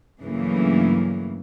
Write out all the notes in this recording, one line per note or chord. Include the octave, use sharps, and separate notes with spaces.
G2 C#3 E3 F#3 A3 A#3